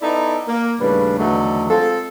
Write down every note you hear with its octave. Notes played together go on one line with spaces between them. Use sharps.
B3 D#4 E4 A4 D5
A#3
D#2 A2 C#3 G3 D4 B4
E2 D3 D#3 F#3 A3
G#3 C4 F4 A4